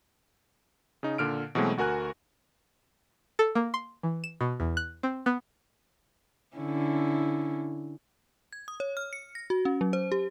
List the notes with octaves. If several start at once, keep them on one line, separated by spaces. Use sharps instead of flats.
C#3 D#4
A#2 D3 F6 D7
B2 E3 F#3 G#3 A3 C4
D2 F#4 A#4 G#5 F#6
A4
A#3
C6
E3
E7
B2
E2
F#6
C4
B3
D3 C#4 E4
G#6
D#6
C#5
F6
C#7
A#6
F#4
C#4
F#3
C5
G4